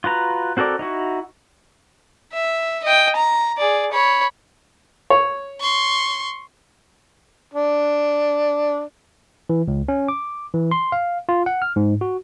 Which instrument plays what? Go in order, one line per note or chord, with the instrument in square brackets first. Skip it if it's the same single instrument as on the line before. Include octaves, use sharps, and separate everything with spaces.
[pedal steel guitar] F4 F#4 B4 A#5
C4 F#4 A4 A#4 D5
D#4 E4 F#4
[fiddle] E5
D#5 G5
A#5
G#4 D5
C#5 B5
[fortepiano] C#5
[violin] C6 C#6
[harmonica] D4
[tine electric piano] E3
C#2
C#4
D6
E3
C6
F5
F4
F#5
F6
G#2
F#4